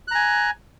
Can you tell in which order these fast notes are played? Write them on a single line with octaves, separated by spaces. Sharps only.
F#6 A#5 G#5